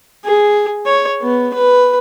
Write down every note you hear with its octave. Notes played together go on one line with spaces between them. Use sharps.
G#4
C#5
B3
B4